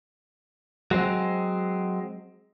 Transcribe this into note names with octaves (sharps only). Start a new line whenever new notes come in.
F#3 G#3 C4